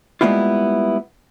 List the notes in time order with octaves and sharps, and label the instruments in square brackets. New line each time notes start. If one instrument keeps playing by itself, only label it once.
[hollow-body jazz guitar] G3 G#3 A#3 B3 E4 F4